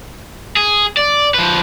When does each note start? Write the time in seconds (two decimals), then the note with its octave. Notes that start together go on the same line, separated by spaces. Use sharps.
0.56 G#4
0.97 D5
1.34 F3 B4